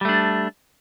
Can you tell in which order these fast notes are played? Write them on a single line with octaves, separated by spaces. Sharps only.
G3 A3 D4